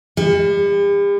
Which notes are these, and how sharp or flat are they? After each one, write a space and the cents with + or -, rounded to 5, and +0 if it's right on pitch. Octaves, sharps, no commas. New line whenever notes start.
G3 +45